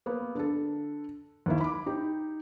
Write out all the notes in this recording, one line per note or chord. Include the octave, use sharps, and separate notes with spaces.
A#3 B3
D3 A4
D#2 A#3 E4
B5 D6
D#4 G4